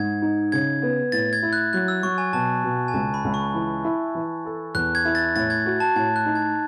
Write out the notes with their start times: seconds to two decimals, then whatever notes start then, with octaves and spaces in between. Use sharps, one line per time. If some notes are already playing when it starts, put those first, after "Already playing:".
Already playing: G#2 G#6
0.22 D#4
0.52 C#3 G#6
0.82 B3
1.12 A2 A6
1.33 G#6
1.43 E4
1.53 F#6
1.73 F#3 F#6
1.88 E6
2.03 F#3 C#6
2.18 G#5
2.33 B2 A5
2.64 B2
2.88 G#5
2.94 C#2 A5
3.14 B5
3.24 C#2
3.34 C#6
3.54 E3
3.84 E4
4.15 E3
4.45 A4
4.75 E2 F#6
4.95 G#6
5.05 E4
5.15 A6
5.36 A2 A6
5.50 G#6
5.66 F#4
5.80 A5
5.96 A2 G#6
6.16 F#6
6.26 D#4
6.36 G#6